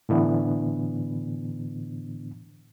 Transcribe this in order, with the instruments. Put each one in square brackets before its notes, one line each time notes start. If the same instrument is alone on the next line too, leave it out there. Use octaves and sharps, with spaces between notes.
[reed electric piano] A2 D3 E3 B3 D4